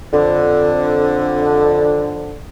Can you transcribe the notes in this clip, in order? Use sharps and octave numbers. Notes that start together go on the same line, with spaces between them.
F2 D3